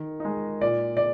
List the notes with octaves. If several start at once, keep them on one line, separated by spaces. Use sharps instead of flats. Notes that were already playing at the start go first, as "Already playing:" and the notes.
Already playing: D#3
G#3 D#4
A#2 D5
D5